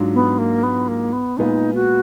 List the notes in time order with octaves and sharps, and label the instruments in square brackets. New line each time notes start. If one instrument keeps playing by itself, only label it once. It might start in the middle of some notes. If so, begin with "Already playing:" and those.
Already playing: [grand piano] G#2 F#3 D4 F4
[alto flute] B3
A#3
B3
A#3
B3
[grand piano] A#2 G#3 B3 F4 [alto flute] D#4
[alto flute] F#4